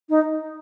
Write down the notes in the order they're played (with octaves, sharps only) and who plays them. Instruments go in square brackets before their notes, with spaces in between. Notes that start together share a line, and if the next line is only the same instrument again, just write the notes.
[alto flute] D#4